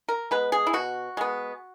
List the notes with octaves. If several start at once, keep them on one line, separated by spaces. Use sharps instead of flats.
A#4
G#3 B3 B4
G#4
E4
B2 F#4
G#3 B3